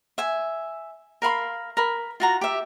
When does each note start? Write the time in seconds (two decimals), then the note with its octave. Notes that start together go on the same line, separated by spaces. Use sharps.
0.18 E5 G#5
1.22 A#4 F5 B5 C6
1.77 A#4 B5
2.20 F4 F#4 A#5
2.41 G4 E5